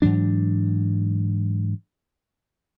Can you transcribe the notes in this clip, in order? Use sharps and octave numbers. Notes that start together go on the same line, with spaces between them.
G#2 E3 F#3 D4